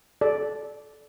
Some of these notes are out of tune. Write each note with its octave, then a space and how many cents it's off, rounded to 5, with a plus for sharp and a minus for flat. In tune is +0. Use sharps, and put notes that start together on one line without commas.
A4 -25 D5 +0